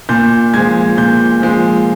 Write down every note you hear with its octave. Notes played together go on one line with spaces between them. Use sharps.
A#2 G6
F3 G#3 G#6
A#2 G6
F3 G#3